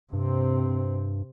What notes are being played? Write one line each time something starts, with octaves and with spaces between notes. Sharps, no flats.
G2 C3 C4